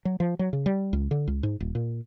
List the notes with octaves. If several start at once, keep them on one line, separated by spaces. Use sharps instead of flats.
F#3
F3
F#3
C#3
G3
C#2
D3
C#2
G#2
D#1
A#2